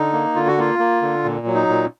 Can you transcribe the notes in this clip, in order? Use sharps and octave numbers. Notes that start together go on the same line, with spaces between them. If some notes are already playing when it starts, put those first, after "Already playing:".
Already playing: D3 D#4
A#3
D3 F4
F#4
A#3 F4
A#3
D3
A#2
F#3
D#4
A#2